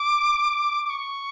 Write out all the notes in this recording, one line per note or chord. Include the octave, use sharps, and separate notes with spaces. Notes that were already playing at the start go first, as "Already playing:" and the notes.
Already playing: D6
D6
C#6